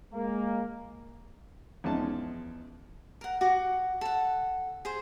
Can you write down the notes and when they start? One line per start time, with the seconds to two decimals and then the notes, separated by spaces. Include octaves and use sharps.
0.13 G#3 A#3
1.84 E2 F3 G#3 C#4 D#4 A5
3.21 A#4 F#5
3.41 F#4 F#5 D6
4.01 A4 F#5
4.85 G#4 C5